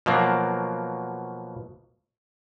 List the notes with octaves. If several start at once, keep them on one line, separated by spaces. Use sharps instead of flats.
B2 F3 F#3 A#3